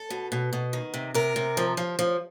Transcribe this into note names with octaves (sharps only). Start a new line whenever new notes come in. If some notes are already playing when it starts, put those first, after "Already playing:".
Already playing: A4
B2
B2
B2
D#3
C3
C3 A#4
C3
F3
F3
F3